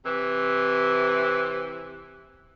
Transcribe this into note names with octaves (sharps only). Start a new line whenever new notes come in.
C3 E3